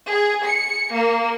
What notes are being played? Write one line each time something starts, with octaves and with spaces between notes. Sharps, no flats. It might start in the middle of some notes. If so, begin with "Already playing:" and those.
G#4
C#7
A#3